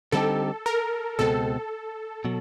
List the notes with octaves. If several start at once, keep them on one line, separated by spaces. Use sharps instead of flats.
D3 G3 C4 D#4 G4 A4
A#4
C#2 B2 G#3 C4 A4
B2 F#3